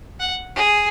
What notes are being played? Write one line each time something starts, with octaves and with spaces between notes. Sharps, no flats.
F#5
G#4